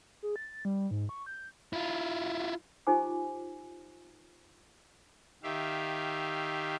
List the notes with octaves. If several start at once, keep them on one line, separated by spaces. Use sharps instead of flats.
G#4
A6
G3
G#2
C#6
G6
E4 F4
D#4 F4 G4 C5 G#5 D6
D#3 G4 E5 F5